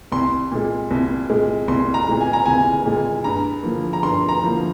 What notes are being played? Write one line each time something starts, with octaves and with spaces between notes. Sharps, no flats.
C2 C6
A#2 G#3
C2
A#2 G#3
C2 C6
A#5
A#2 G#3
G#5
A#5
C2 G#5
A#2 G#3
G2 A#5
D3 F3 A#3
A#5
G2 C6
A#5
D3 F3 A#3